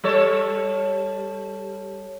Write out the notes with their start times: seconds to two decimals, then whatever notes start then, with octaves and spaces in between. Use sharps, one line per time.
0.04 G3 A4 C#5